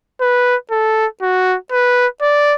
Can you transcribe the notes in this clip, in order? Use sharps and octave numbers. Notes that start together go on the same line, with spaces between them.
B4
A4
F#4
B4
D5